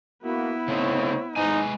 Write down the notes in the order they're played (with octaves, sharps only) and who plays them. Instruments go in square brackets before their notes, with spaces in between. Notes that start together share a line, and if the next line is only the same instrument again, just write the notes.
[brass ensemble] A#3 F#4 [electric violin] B3 E4
[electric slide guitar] C#3 A3 D#4 [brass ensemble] C4 C#5
[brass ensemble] G#2 [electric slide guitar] G#3 B4 G#5 [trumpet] D#4